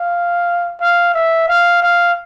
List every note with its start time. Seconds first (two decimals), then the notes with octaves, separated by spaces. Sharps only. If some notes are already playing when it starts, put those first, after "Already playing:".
Already playing: F5
0.80 F5
1.14 E5
1.48 F5
1.82 F5